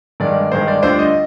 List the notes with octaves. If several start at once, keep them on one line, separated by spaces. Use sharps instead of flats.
G2 D#3 G#3 D5
G2 D#3 G#3 C5
D5
D2 D3 G3 D4 F4 C5
D#5